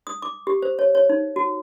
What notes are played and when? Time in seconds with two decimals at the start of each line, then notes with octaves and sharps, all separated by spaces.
0.07 D#6
0.22 D6
0.47 G4
0.62 C5
0.79 C#5
0.95 C#5
1.09 D#4
1.36 F#4